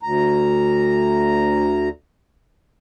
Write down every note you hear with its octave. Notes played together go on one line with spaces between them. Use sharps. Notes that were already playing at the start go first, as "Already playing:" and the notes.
D2 A#5